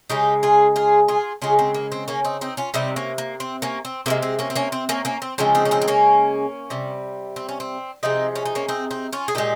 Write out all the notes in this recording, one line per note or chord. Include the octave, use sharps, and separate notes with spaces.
C#3 G#3 D#4 G4
F4 G#4
F4 G#4
F4 G#4
C#3 G#3 F4 G#4
C4
A#3
C4
A#3 C#4
C4 D#4
C4 D#4
C#4 F4
C3 G3 C4 D#4
A#3 C#4
A#3
C4
A#3 C#4
C4
C3 F3 G#3 A#3
C4
A#3 C#4
C4
A#3 C#4
C4
A#3 C#4
A#3 C#4
C4
C#3 F3 G#3 C4
C4 D#4
C#4
C4 D#4
C4
A#3 C#4
C3 G3
C4
C#4
C4
C3 F3 G#3 C4 D#4
C#4
D#4
A#3 C#4
C4 D#4
C4 D#4
C#4 F4
G#4
A#2 G#3 D#4 G4